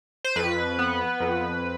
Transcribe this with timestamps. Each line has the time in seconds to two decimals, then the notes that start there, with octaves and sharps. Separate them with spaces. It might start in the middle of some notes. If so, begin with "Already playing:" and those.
0.24 C5
0.36 F2 B4
0.79 B3
1.20 F2